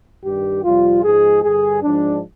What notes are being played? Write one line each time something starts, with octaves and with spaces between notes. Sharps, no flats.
G2 D#3 G3 G4
F2 C3 G3 F4
G#2 F3 G#3 G#4
G2 D3 G3 G#4
G#2 F3 G#3 D4